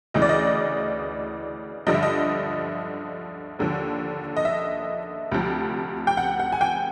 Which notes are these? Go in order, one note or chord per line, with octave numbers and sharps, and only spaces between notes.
D2 C#3 E3 D#5
D5
D#5
G2 D3 F3 D#5
E5
D#5
D#2 D3 F3
D#5
E5
D2 C3 F3
G5
F#5
F#5
G#5
G5